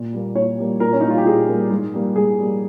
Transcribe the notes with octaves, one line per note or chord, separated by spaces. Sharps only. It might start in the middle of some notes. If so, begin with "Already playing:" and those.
Already playing: A#2
G3 A#3
A#2 C#5
G3 A#3
A#2 A#4
C#4
G3 A#3 D#4
F4
G4
A#2 G#4
G3 A#3
G#2
G3 A#3
G#2 G#4
G3 A#3